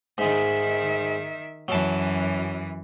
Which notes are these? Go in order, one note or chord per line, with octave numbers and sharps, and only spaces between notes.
G#2 D#3 G#3 E5
F#2 E3 F#3 A5